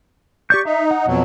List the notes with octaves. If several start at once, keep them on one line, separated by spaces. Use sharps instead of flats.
G4 D5 C#6 G6
D#4 E5
F#5
F2 B2 F#3